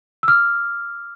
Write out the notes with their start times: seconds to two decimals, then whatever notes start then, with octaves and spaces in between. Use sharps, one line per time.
0.23 E6
0.28 D6 F6